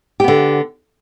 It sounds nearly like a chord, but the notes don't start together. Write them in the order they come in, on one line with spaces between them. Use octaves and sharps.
G4 B3 D3